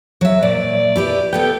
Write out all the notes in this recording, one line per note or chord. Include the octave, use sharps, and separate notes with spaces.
F#3 E5
A#2 D5
E4 G4 B4
B3 A4 B4 G5